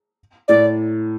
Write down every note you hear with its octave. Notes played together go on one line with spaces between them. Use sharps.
A2 D5